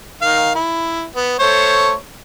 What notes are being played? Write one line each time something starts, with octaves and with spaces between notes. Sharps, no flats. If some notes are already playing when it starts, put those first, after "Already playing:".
D#3 F5
E4
B3
A3 C5 C#5